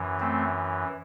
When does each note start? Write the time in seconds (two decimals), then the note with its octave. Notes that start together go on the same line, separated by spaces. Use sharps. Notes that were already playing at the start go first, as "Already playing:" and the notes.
Already playing: F#2 E3
0.20 A3 C4